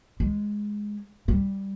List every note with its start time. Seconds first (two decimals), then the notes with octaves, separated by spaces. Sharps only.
0.20 G#3
1.28 G3